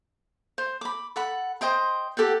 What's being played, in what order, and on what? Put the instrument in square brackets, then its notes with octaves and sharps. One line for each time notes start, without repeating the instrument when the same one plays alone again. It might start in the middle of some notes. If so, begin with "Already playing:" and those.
[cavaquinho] C5
B5 D6
A4 F#5 B5
C5 D#5 G5 C6
G4 A4 F#5 G5